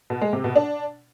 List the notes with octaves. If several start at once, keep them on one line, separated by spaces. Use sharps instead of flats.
B2
G#3
C3
B2
D4